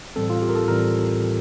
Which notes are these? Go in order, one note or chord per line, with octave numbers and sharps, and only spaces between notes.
A2 E3 G3 C4 A4
F4
G4
A#4
A4
A2 E3 G3 C4 A#4